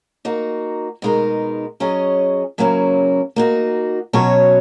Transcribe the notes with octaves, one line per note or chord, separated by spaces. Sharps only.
A#3 D#4 F#4
B2 G#3 B3 D#4 A#4
F#3 C#4 G#4 D#5
C#3 F#3 A#3 C#4 E4
A#3 D#4 F#4
B2 F#3 C#4 F#4 C#5